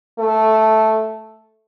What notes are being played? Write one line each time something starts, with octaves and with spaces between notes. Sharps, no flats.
A3